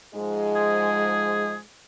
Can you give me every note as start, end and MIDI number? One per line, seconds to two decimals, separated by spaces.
0.15 1.60 44
0.15 1.60 53
0.15 1.60 56
0.56 1.55 68